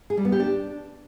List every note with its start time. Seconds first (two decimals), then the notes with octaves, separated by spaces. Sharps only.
0.10 G#4
0.17 G3
0.25 B3
0.32 G4
0.40 D4